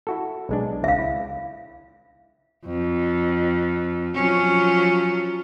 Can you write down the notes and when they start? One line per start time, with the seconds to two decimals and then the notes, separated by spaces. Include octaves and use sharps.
0.07 E4 F#4 A4
0.49 B1 G#3 D4
0.84 C#2 E5 F5
0.98 E4
2.65 F2
4.14 F3 F#3 C#4